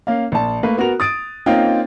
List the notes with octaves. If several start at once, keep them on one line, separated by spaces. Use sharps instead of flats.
A#3 C#4 F5
A#1 A5
A3 A#3 B4
B3 F#4 A#4 F7
D#6 A6 D7
A#3 C4 C#4 D#4 F4 G5